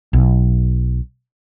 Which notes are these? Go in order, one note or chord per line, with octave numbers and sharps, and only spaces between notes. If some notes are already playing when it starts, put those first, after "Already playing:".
B1